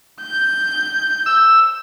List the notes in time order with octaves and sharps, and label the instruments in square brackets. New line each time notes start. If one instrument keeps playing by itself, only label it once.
[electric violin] G6
[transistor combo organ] E6